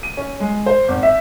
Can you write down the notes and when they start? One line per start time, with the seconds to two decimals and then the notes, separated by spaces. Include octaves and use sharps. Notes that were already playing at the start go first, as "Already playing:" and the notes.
0.03 D#7
0.17 C#4
0.40 G#3
0.66 C5
0.88 G#1
1.03 E5